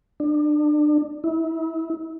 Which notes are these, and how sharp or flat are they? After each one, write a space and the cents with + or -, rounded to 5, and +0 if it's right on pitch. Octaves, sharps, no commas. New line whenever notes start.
D4 +30
E4 -35